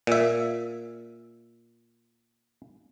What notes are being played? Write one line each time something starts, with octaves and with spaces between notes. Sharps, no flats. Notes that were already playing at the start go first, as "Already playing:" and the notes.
A#2 E5